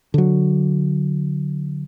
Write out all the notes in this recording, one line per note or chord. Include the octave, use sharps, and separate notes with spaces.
D3 F#3